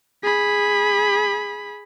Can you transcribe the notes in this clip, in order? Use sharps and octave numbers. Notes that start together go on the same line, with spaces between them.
G#4 B5